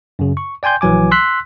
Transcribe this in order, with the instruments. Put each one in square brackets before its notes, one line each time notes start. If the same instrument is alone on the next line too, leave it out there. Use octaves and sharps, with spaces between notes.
[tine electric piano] F#2 C#3
C#6
D5 G5 G#5 C6 G6
A#1 E3 F#3 G#5 D6
C6 E6 F#6 B6